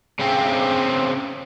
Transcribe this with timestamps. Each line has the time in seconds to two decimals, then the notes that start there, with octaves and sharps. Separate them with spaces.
0.20 C#3 C4